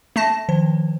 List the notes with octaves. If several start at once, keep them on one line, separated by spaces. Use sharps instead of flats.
A3 A5 A#6
D#3 F3 C5